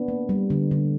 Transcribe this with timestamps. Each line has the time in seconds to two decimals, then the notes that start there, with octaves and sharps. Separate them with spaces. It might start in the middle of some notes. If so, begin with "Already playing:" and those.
Already playing: B3 D4
0.08 A#3
0.29 G3
0.50 D3
0.71 D3